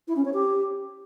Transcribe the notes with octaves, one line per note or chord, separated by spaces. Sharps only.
E4
C#4
C#5
G4